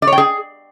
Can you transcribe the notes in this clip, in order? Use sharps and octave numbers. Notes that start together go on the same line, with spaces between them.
D5
C#5
G5
G#4